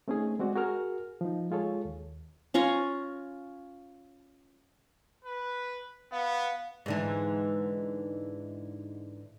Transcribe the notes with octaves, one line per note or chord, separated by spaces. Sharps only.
A3 C4 C#4 D#4 G#4
G#3 C4 F#4 D5
F#4 G#4 A#4 F6
F3 D#4
G#3 F4 G#4 A4 C#5
D#2
C#4 F4 A#5 C#6
B4
B3 F5
G#2 D3 E3